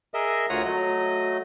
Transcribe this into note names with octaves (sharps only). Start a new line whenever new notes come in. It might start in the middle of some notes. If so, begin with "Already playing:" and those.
G#4 A#4 D#5 E5
D2 F4 C#5 F#5 A#5 D#6
F#3 A3 D#5